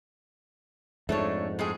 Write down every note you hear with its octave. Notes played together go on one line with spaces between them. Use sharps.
F2 G#2 A3 D4 C#5
A2 G#3 G#4